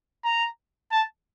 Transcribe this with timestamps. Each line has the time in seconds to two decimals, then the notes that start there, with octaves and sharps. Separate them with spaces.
0.24 A#5
0.92 A5